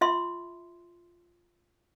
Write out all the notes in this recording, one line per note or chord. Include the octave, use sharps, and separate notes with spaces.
F4 E5 C6